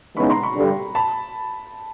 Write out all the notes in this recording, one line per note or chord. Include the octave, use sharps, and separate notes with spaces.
C#3 E3 G#3 B3 D#4 B5 C#6
A#5 C6
B5 C#6
G2 D3 G3
A5 B5